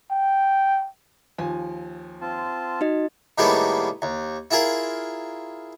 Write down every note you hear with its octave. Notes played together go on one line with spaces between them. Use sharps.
G5
D#2 F3 G#5
C4 F4 A5
D#4 F#4 D#5
A2 D#3 G3 G#3 A#3 B3
D#2
E4 F4 G#4 A#4